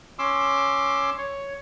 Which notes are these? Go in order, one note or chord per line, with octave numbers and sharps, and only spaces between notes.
C#4 C6 D6 E6
C#5